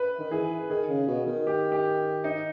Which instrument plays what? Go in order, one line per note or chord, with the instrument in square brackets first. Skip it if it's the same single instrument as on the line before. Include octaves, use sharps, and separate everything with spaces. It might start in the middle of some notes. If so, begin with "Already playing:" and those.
Already playing: [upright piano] B4
[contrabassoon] D#3
[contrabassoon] E3 [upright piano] G#4
[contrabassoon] D#3 [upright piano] G#4
[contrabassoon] C#3
B2
D#3
[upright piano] G4
G4
D#4